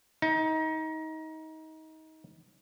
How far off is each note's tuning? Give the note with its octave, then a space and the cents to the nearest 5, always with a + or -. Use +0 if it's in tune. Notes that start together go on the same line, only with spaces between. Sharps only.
D#4 +25